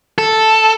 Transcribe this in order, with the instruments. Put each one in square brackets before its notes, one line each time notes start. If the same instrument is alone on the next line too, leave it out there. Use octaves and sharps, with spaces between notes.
[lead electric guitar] A4